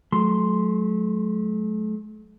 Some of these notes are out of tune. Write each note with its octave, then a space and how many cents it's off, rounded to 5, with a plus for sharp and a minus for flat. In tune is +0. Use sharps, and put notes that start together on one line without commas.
F#3 -10 A3 -40 C6 +0